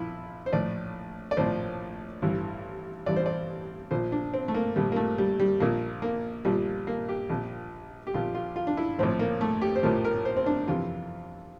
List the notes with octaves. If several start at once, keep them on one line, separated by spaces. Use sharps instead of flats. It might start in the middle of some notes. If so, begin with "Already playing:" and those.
Already playing: A#1 A#2 F3 E4 F4
C5
A#1 A2 F3 D5
D5
A#1 A2 F3 C5
A1 G2 E3
A1 G2 E3 D5
C5
D5
A#1 A#2 F3 C5
D4
C4
A3
A#3
A#1 A#2 F3 G3
A#3
A3
G3
G3
A#1 A#2 F3 A#3
A#3
A#1 A#2 F3 G3
A#3
G4
A#1 A#2 F3
G4
A#1 A#2 F3 F4
F4
F4
D4
E4
A#1 A2 F3 C4
A#3
A3
G4
C5
A#1 A2 F3 A#4
A#4
C5
C4
D4
F2 C3 E3 F4